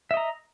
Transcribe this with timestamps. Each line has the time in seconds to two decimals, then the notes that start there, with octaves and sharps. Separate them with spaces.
0.11 E5
0.14 D#5
0.17 A#5